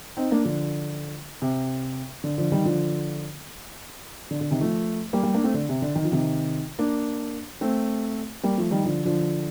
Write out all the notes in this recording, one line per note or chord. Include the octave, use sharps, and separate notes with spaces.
C4 D#4
A#3 D4
D3 F3
C3
D3
D3 F3
D#3 G3
D3 F3
D3
D3
C3 D#3
F3 A3
G3 A#3
G3 A#3
A#3 D4
A3 C4
D3
C3
D3
D#3
F3
C3 D#3
A#3 D4
A3 C4
G3 A#3
F3 A3
D#3 G3
D3 F3
D3 F3